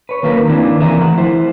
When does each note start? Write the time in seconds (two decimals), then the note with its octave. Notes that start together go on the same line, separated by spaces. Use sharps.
0.09 B4 C#5
0.23 D#3 F#3 A#3 D#4 A#4 B4
0.48 D#3 A#3 C4 D4 E4 F4
0.81 C#3 E3 G#4 A#4 E5 A#5
0.99 F3 A3 F#5
1.18 E4 C5